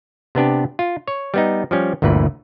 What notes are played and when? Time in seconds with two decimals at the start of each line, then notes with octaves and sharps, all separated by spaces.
0.35 C3 B3 D4 G4
0.79 F4
1.08 C#5
1.34 G3 B3 D#4
1.71 F3 G3 C#4
2.02 G1 D2 A#2 E3 B4